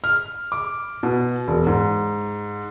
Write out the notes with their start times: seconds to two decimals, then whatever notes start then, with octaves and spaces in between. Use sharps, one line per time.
0.04 F6
0.52 D6
1.03 B2
1.48 E1
1.67 G#2